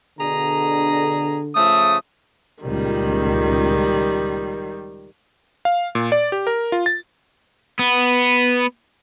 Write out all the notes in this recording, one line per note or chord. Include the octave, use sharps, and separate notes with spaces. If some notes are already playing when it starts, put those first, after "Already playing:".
B2 D3 G#4 A#5
C#3 F3 A3 D#6
C#2 A#2 D#3 G3
F5
A#2
D5
G4
A#4
F4
A6
B3